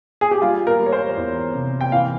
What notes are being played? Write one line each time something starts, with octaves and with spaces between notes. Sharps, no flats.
G#4
G4
G3 F4
A#4
G3
C#5
C5
E2
C3
G5
E3 F5